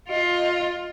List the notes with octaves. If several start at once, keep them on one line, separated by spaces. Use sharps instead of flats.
F4 D#5